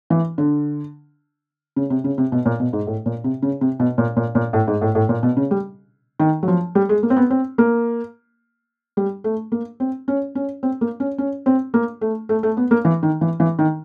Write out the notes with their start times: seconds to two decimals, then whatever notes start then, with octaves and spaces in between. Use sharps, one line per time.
0.10 E3
0.38 D3
1.76 C#3
1.90 C3
2.04 C#3
2.18 C3
2.32 B2
2.45 A#2
2.60 B2
2.73 G#2
2.87 A2
3.06 A#2
3.24 C3
3.42 C#3
3.61 C3
3.80 B2
3.98 A#2
4.17 A#2
4.35 A#2
4.53 A2
4.67 G#2
4.81 A2
4.95 A2
5.09 A#2
5.23 B2
5.37 C#3
5.51 G3
6.20 D#3
6.43 F#3
6.48 F3
6.75 G3
6.89 G#3
7.03 A#3
7.10 C4
7.16 B3
7.30 C4
7.58 A#3
8.97 G3
9.24 A3
9.52 A#3
9.80 C4
10.08 C#4
10.35 C#4
10.63 C4
10.81 A#3
11.00 C#4
11.18 C#4
11.46 C4
11.74 A#3
12.01 A3
12.29 A3
12.43 A3
12.57 B3
12.71 A#3
12.85 E3
13.03 D#3
13.21 E3
13.40 E3
13.59 D#3